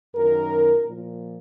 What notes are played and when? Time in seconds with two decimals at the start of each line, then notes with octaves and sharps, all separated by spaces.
0.15 F#2 D#3 A#4
0.83 A#2 F3